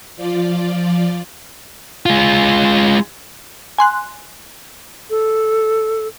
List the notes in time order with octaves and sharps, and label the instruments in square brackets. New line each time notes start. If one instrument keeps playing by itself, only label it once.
[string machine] F3 F4 D5
[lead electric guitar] G#3 F4
[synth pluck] G#5 C6 F#6
[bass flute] A4